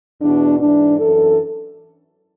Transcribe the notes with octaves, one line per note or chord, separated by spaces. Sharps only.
E2 B2 D4
G#2 E3 D4
F#2 E3 A4